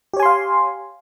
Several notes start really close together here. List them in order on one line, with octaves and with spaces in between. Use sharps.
G4 C#5 G#5 C6 F5